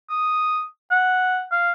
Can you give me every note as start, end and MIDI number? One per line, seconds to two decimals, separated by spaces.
0.10 0.62 87
0.91 1.43 78
1.52 1.72 77